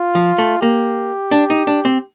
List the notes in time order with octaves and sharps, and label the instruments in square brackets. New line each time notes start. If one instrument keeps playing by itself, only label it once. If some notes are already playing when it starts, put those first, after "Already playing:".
Already playing: [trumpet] F4
[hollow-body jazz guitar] F3
A3
[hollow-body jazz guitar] A#3 [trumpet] G4
[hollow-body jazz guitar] D4
D#4
D4
C4